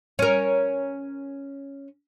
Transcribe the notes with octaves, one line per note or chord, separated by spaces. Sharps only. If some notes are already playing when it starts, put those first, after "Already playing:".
C#4 A#4